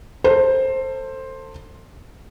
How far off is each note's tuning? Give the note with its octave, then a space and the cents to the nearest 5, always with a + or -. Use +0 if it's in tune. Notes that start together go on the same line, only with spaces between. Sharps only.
A4 +30 C5 +10